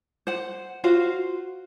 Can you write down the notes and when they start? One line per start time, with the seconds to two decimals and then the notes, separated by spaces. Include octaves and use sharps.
0.27 C5 F#5
0.84 F4 F#4 C5 F5